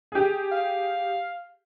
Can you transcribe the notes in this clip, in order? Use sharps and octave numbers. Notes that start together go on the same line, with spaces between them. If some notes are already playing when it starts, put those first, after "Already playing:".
G4 G#4
F5